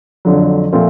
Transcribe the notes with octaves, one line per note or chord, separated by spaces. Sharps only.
F2 D3 F#3
A#2 F3 A3 C4